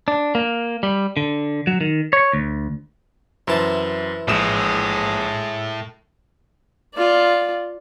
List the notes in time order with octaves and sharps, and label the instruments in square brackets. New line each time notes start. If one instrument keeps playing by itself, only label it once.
[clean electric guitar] D4
A#3
G3
D3
F#3
D#3
C#5
D2
[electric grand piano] F#2 [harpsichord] C3 E3 A5
[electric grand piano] A#1 D#6 E7 [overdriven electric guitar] A2 [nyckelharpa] G#3
[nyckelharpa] F4 D5